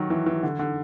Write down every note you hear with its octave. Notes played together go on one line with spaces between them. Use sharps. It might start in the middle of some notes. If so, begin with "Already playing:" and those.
Already playing: D#3 F#3
E3
E3
D3
D3